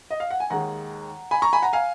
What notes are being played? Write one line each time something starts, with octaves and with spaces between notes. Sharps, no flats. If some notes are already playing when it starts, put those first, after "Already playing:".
D#5
F5
F#5
G#5
D#2 D#3 G#3 F#5 A#5
G#5 B5
A#5 C#6
G#5 B5
F#5 A#5
F5 G#5